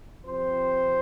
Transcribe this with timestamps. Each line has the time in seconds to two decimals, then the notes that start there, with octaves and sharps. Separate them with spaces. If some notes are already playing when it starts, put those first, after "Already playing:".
0.25 C3 F3 C4 C5